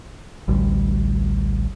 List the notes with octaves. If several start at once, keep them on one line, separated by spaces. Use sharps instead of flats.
A1 D2 G3